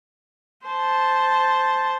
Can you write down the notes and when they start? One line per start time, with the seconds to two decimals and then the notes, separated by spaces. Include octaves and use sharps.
0.66 C5 A5